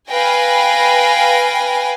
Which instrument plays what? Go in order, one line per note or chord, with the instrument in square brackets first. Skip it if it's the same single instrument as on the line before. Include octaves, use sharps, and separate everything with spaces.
[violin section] B4 F5 G5 G#5 A#6